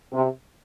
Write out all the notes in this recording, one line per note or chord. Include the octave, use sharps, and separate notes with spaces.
C3